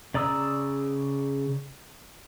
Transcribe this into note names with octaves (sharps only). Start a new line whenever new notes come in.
C#3 D5 A#5 D#6 E6